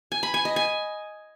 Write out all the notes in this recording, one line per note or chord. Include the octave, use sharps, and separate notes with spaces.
G#5
B5
G#5
D#5
G#5